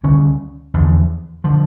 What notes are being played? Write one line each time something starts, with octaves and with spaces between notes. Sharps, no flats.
D2 D3 G3 C#4
E2 D3 F3
D3 F3